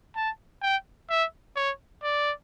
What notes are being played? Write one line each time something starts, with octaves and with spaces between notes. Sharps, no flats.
A5
G5
E5
C#5
D5